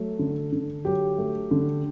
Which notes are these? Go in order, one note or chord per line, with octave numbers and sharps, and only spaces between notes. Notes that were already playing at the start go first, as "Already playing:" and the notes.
Already playing: F#3 A3 A4
D3
D3
F#3 G4
A3
D3